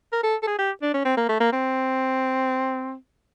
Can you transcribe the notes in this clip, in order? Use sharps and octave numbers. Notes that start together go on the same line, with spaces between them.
A#4
A4
A4
G#4
G4
D4
C#4
C4
A#3
A3
A#3
C4